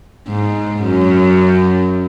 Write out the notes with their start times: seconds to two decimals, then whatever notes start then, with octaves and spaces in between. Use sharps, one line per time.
0.28 G#2
0.84 F#2